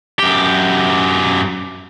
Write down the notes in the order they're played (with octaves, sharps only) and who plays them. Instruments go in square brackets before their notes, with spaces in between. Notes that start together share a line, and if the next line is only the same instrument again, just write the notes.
[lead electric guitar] F#2 G4